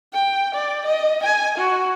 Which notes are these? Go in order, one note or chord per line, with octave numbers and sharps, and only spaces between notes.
G5
D5
D#5
G#5
F#4